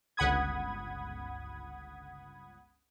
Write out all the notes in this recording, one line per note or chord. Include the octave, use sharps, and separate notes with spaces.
G1 C#2 F#5 B5 D#6 G#6